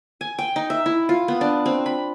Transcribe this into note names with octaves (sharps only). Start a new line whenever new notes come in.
G#5
G5
D#4
E5
E4
F4
B3
D4
C4
B5